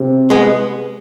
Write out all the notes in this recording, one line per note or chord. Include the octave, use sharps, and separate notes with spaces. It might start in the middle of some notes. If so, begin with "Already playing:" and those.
Already playing: C3
G#3 B3